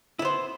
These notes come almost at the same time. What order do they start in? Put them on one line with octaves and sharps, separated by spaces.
E4 B3 C5